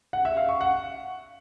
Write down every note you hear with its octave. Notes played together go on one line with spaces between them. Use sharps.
F#5
E5
F5
C#6
F#5